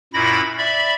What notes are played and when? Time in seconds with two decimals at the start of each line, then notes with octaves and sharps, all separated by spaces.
0.14 F#2 A#2 E4 B5 A#6
0.58 D5 E5 B5